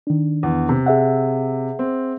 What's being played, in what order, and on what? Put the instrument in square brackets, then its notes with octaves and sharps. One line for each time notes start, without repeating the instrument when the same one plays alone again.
[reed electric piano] D#3 D4
[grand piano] E2
C3
[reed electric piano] G#4 E5 F#5
[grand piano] C4